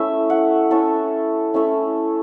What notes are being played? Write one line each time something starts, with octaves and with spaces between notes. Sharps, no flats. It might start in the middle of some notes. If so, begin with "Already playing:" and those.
Already playing: A3 C#4 E4 E5
F#5
A3 C#4 E4 A4
A3 C#4 E4